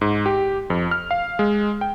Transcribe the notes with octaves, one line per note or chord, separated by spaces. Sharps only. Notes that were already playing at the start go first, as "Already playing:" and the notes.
G#2
G4
F2
F6
F5
G#3
G5